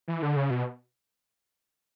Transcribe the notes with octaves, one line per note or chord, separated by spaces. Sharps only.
E3
D3
C#3
B2